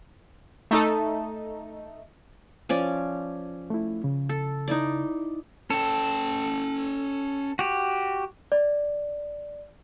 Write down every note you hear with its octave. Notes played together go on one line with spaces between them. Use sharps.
A3 D#4 A4
F3 C#4 D5
A3 E4
C#3
A4
D#4 E4 D5
C#4 A4 G5
F#4 G4
D5